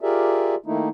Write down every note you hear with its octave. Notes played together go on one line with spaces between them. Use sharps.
F4 G4 G#4 A#4 D5 E5
D#3 A3 A#3 D#4 E4